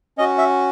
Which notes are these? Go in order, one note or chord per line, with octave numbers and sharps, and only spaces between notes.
C#4 F#4 D#5
E5